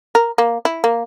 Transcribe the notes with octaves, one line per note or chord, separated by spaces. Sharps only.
A#4
A#3
E4
A#3